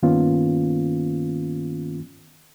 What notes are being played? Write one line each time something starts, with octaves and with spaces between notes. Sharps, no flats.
G2 D#3 A#3 B3 C#4 F4